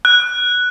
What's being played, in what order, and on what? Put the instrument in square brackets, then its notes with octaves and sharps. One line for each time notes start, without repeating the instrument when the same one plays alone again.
[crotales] F#6